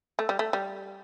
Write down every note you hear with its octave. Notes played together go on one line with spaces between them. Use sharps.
A3
G3
A3
G3